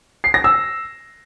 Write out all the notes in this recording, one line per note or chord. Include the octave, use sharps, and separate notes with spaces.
C7
A#6
E6